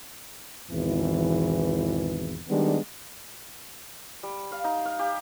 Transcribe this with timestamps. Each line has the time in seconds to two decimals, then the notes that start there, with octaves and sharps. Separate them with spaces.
0.70 G#1 E2 B2 E3
2.49 D#3 G3 G#3 B3 D4
4.23 G3
4.52 F5
4.64 D#4
4.85 F5
4.99 G4